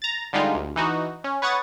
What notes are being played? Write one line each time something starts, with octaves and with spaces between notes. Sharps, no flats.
A#5 A6
D3 G3 G#3 D#4 F4
D2
E3 D#4 F#4
C#4
B4 C#5 F#5 C#6 D#6 A6